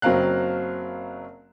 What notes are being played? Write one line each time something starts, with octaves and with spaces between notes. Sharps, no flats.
F#1 F#3 C4 A#4 F5 F#6